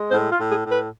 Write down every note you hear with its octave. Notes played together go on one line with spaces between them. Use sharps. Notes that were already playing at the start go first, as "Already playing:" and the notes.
Already playing: G#3
A2 C5
F4
A2
G#4
A2
B4